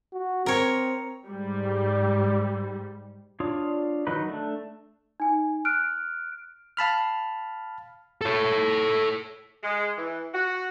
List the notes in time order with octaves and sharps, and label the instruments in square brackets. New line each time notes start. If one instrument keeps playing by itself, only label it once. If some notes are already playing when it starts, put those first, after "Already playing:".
[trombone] F#4
[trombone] C4 [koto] A#4 C#5
[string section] G#2 G3
[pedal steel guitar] D4 F4 C#5 D5 D#6
D#3 F#3 D#4 B4
A3 D4
[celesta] D#4 G#5
F6 F#6 D7
[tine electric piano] F5 A5 B5 F6
[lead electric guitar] A4 C#5
[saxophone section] G#3
E3
F#4